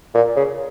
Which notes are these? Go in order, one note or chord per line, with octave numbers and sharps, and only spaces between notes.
A#2
C#3